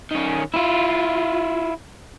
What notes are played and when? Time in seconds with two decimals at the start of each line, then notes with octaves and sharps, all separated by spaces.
0.11 D#3 C#4
0.54 E4 F4